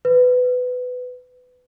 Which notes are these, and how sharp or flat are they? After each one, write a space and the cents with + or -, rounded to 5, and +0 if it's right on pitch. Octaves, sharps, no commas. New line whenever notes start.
B4 +15